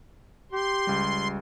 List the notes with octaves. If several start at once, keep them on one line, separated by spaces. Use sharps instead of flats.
G4 C6
C#2 G3